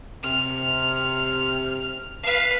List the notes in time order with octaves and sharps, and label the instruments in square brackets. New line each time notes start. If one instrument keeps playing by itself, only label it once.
[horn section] C3 [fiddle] F6
[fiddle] B4 F5